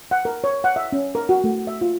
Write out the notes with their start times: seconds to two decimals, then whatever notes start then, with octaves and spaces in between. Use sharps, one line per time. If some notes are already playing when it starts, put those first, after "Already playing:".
0.11 F#5
0.25 A#4
0.44 C#5
0.64 F#5
0.76 E5
0.92 C#4
1.15 A#4
1.29 F#4
1.44 A3
1.67 E5
1.81 F4